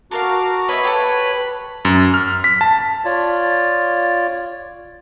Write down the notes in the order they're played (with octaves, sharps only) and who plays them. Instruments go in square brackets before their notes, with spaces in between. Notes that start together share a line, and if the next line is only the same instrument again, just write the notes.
[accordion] F#4 A#5 D6 [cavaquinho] A4 A#4 F5
[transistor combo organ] B4 [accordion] C#5 [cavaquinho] D#5 E5 B5
[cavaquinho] F4 G4 A4
[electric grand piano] F#2
F6
B6
A5
[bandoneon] F4 C#5 D5